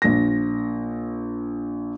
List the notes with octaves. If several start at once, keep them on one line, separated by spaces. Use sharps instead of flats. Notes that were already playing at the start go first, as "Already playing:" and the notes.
A#1 A#6